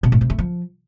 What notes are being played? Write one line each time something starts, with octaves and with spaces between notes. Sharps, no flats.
B2
A2
C3
A3
F3